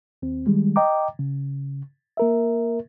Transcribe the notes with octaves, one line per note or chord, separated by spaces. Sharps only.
D#2 C4
D#3 G3 G#3
D#5 G5 A#5 D6
C#3
A#3 A#4 E5